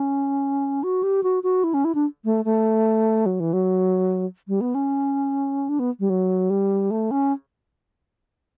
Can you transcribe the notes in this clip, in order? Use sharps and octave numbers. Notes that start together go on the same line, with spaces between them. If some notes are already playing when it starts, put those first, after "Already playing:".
Already playing: C#4
F#4
G4
F#4
F#4
E4
C#4
E4
D4
A3
A3
F#3
E3
F#3
G3
B3
C#4
D4
B3
G3
F#3
G3
A3
C#4